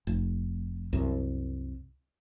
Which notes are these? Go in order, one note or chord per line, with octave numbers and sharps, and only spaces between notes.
F1
C2 F#2